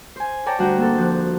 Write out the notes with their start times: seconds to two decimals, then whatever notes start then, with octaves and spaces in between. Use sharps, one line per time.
0.16 C5 G#5
0.46 C#5 D5 G5 A5 A#5
0.59 D2 G3 D4 F#4 F#5 G5
0.78 A#3 C4 A4
0.97 F3 F#6